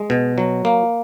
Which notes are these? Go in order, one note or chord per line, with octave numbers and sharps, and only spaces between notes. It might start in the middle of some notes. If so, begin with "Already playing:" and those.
Already playing: G#3
B2
F#3
A#3